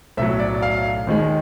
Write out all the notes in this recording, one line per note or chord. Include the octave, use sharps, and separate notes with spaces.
B1 A2 F#3 E5
D5
F5
D#2 D#3 G#3